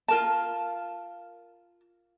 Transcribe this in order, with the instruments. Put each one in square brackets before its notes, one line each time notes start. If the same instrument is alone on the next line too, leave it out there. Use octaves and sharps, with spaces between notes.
[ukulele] F4 A#4 A5